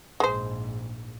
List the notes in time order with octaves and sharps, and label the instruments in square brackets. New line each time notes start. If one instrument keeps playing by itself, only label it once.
[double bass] A#1 G#2 [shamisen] G#3 C5